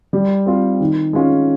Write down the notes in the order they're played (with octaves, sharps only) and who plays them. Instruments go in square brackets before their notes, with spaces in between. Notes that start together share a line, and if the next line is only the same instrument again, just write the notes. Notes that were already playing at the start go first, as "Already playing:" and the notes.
[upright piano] G3
C4 F4
D#3
G#3 C#4 F4